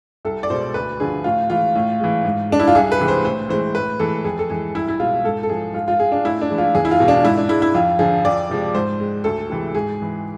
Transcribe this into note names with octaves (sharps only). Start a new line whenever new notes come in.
C2 A4
D5
B2 G#3 C5
D2 B4
D3 F3 G#4
A2 F4
E3 G#3 F4
A2
E3 G#3
G#2
G#3 D4
E4
F4
C2 G#4
B4
C3 E3 G#3
C5
A2 C5
E3 G#3 C5
A2 B4
E3 G#3 A4
F2 G#4
A4
E3 G#3 G#4
C2 E4
E4
B2 G#3 F4
G#2 A4
A4
F3 G#3 G#4
G#2 F4
F4
G#3 G#4
D4
A2 E4
D4
E3 G#3
F4
E2 G#4
E4
F4
B2 G#3
D4
G#2 E4
D4
G#3 E4
E4
F2 F4
D3 F3 G#4
F2 D5
C3 F3 G#3
G#2 C5
G#3
D2 A4
C3 E3 G#3
G#2 G#4
E3 G#3